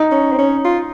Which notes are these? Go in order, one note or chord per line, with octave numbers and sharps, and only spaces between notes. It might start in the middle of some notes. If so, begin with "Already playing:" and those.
Already playing: D#4
C#4
C4
C#4
F4